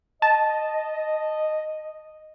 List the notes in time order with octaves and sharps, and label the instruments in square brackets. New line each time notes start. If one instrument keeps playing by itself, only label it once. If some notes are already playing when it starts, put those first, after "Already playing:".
[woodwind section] D#5 [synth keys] A5